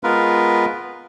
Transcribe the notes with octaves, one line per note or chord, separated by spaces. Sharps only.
G#3 B3 F4 A#4 B4